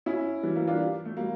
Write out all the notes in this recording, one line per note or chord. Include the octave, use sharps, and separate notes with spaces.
C#4 E4
E3 G3
G3 A#3
D4 F4
A3
G3 A#3